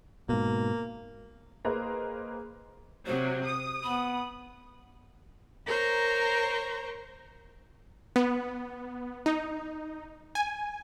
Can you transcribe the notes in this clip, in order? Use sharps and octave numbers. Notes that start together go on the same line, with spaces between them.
G#2 B2 A#3
A#3 G#4 B4 C5 D#5 A#5
C3 F#3 C5
D#6
B3 B5
A#4 C5 C#5 A#5
B3
D#4
G#5